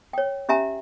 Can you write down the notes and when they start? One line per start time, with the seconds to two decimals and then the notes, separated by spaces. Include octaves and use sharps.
0.13 C#5 G5
0.49 C#4 G4 E5 G#5 A#5